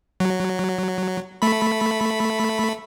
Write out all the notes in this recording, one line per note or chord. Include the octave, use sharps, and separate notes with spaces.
F#3
A3 B5